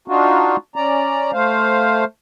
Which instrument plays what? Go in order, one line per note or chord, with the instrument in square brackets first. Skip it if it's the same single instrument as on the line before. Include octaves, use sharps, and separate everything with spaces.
[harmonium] D4 D#4 F4 F#4
C#4 D5 A#5
A3 C5 F5